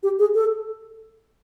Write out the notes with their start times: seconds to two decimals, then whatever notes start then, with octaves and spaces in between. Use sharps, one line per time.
0.03 G4
0.19 G#4
0.35 A4